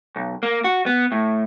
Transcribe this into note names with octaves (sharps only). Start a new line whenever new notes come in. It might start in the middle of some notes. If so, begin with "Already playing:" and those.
B1
A#3
F#4
B3
A2